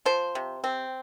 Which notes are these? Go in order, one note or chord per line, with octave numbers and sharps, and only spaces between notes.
F3 C5
C3
C4